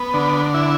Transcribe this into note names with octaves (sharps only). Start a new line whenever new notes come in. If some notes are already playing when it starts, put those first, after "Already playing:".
Already playing: B3
D3
E4